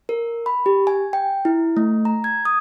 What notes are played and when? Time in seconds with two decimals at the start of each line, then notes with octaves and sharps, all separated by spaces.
0.09 A#4
0.46 B5
0.66 G4
0.87 G#5
1.13 G5
1.45 E4
1.77 A3
2.05 A#5
2.24 G#6
2.45 D#6